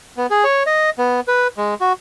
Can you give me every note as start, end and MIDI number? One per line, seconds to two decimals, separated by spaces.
0.17 0.27 59
0.31 0.44 68
0.44 0.63 73
0.67 0.90 75
0.98 1.20 59
1.28 1.47 71
1.58 1.74 56
1.81 1.93 66